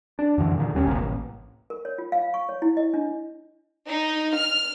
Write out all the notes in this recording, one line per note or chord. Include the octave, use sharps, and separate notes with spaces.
D4
F#2 D3 E3 F3
A#2 D3 D#3
D#2 G3 C#4
D1 G#1 C3 A#3
A1
A#4
C#5
F4
F5
C#6
C#5
E4
D#5
D4
D#4
F6